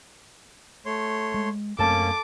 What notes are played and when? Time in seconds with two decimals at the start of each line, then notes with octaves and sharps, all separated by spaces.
0.86 A3 C#5 C6
1.34 G#3
1.79 F#2 A3 A#3 C4 C#4 A4 A5 D6